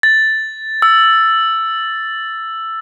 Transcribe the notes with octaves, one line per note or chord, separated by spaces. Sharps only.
A6
E6